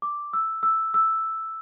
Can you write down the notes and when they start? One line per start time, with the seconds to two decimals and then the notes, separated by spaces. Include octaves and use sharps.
0.02 D6
0.33 E6
0.63 E6
0.94 E6